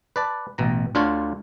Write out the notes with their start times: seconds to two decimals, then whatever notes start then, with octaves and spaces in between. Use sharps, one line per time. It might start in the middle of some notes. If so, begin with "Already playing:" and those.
0.16 B4 D5 A5
0.58 A1 B2 A#5
0.95 D2 D3 D4 F4 C#5 D5